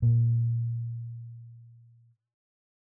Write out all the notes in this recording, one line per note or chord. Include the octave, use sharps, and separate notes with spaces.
A#2 A#3